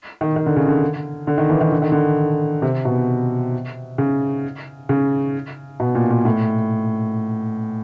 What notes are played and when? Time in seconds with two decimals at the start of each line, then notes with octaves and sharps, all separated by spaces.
0.21 D#3
0.36 D#3
0.46 D3
0.56 C#3
0.68 D3
1.27 D3
1.38 D#3
1.50 E3
1.61 D#3
1.72 D3
1.82 D#3
1.92 D3
2.62 C3
2.85 B2
3.98 C#3
4.89 C#3
5.80 B2
5.95 A#2
6.11 A#2
6.25 A2